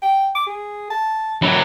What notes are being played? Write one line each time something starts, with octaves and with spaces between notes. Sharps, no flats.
G5
D6
G#4
A5
F#3 E4